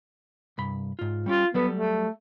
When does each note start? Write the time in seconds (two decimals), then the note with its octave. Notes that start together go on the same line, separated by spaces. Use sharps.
0.58 C2 G2 B5
0.99 G#2 F4
1.26 G3 C#4 F4 G4
1.54 F#3 G3 B3 A4
1.74 A3